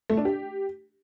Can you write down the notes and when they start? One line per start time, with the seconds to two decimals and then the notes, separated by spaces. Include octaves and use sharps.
0.10 A3
0.17 D4
0.25 G4